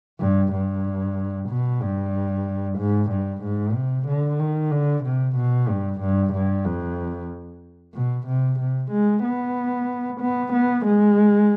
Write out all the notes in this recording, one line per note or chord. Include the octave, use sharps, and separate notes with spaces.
G2
G2
B2
G2
G#2
G2
G#2
C3
D3
D#3
D3
C3
B2
G2
G2
G2
F2
B2
C3
C3
G#3
B3
B3
B3
G#3